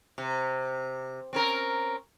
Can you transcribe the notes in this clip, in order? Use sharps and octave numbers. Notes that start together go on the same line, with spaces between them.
C3
C4 C#4 A#4